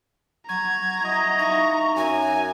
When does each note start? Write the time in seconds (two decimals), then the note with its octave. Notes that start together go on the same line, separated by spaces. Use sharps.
0.49 F#3 F#5 A#5 C#6 G#6
1.03 E4 F#4 D#5
1.39 D#4 E5 F5 C#6
1.96 F#2 G#5